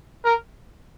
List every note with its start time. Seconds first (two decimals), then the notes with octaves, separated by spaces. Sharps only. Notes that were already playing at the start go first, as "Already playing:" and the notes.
0.25 A#4